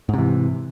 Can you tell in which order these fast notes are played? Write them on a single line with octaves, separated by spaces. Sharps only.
G#2 C3 E3